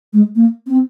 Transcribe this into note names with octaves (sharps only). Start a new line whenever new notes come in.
G#3
A#3
C4